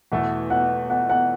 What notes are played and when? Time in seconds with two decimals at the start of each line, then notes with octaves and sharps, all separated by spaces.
0.12 E2 B2 A3 E4 A4 F#5
0.50 F#5
0.90 F#5
1.10 F#5